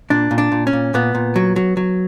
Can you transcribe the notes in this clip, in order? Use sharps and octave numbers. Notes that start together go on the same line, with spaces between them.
A#2 D4
A#2
D4
A#2
C#4
A#2
A#2 B3
A#2
F#3
F#3
F#3